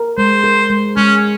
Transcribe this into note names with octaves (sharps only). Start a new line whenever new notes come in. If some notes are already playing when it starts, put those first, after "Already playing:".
Already playing: A#4
G#3 C5
A#4
G#3
G#3 C#4